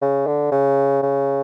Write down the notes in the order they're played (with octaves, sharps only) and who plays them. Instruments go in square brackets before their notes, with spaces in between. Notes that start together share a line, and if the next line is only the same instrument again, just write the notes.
[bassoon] C#3
D3
C#3
C#3